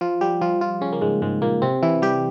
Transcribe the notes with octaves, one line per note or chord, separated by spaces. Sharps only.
F3 F4
G3 G4
F3 F4
F3 F4
C#3 C#4
A#3
G#2 G#3
G#2 G#3
A#2 A#3
C3 C4
E3 E4
G3 G4